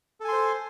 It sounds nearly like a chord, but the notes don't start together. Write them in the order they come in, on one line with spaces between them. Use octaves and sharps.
A4 G#5 C6 C5